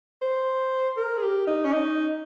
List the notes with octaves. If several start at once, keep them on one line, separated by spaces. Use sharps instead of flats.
C5
A#4
G#4
G4
D#4
C#4
D#4